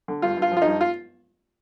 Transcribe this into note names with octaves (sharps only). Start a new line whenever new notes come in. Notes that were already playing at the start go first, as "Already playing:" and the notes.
D3
G2 F4
G2
F4
F3
F4
D#4
G2
F4